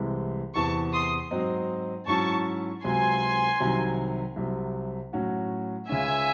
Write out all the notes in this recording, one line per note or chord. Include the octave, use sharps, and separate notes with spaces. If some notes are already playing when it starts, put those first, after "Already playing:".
Already playing: C2 C3 E3 G#3
E2 C3 E3 A5 C#6
C6 D#6
G#2 F#3 C4 D#4
G#2 F#3 C#4 E4 A5 C#6
C#2 C3 F#3 G#5 C6
C2 C3 D#3 F#3
C2 C3 F#3
A2 F#3 C#4 F#4
C#2 C#3 G#3 C#4 E5 G#5